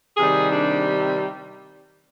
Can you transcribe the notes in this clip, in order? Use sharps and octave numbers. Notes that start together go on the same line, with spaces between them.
C3 D#3 G3 G#4
D4